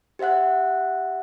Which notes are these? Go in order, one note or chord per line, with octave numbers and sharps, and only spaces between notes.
G4 C5 E5 F#5 F#6